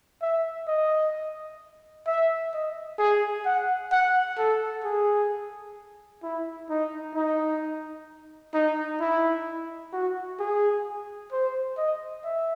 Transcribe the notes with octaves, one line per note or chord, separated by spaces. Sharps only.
E5
D#5
E5
D#5
G#4
F#5
F#5
A4
G#4
E4
D#4
D#4
D#4
E4
F#4
G#4
C5
D#5
E5